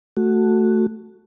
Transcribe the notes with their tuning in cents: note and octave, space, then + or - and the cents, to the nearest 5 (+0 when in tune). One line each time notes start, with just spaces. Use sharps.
A3 +5 F#4 +0